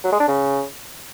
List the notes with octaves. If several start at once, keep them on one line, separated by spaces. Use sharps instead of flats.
F#3
G#3
D4
C#3